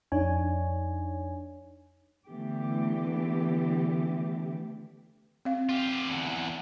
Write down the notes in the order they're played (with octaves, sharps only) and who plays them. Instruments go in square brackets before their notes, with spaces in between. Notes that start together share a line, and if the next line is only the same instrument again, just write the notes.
[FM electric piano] F2 D4 D#4 C#5 G#5
[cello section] D3 E3 A3 B3 G4
[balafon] C4 F5
[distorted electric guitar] F4 G4
E2 D3